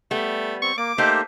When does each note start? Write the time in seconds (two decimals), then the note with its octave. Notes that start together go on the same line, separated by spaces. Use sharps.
0.11 G3 A3 B3
0.62 C4 C#6
0.78 A#3 D6
0.98 A3 A#3 D#4 G4 C5 E5